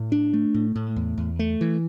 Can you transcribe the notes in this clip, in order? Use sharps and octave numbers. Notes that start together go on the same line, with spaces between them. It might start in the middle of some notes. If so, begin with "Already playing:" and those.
Already playing: A2
D4
A3
A2
A2
E2
E2
A3
E3